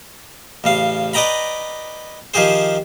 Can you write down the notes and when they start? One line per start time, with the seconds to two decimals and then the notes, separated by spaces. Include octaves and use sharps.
0.64 A1 C#3 F5
1.13 B4 D5 D#5 G5 A#5 B5
2.34 D#3 F3 G4 G#4 C5